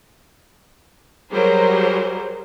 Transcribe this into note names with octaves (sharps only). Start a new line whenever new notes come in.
F#3 G3 G#4 A#4 C5